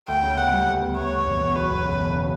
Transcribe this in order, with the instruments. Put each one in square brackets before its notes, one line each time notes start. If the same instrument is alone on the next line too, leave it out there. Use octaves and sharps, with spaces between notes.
[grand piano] D2 [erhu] G5
[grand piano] C#3
[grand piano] B3 [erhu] F#5
[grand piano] G3
D2
B3
[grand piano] B3 [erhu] C#5
[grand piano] D2
E1
E2
[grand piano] F#3 [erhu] B4
[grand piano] E1
C#3
E1
C#3